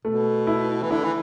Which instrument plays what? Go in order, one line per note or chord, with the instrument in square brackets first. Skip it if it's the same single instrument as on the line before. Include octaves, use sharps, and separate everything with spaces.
[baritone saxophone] B2 [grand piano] A3
[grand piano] E4
[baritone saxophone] E3
[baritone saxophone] D3 [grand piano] E4
[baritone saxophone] E3